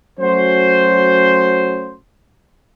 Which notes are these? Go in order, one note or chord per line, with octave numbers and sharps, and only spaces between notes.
F#3 A3 C#4 F#4 C5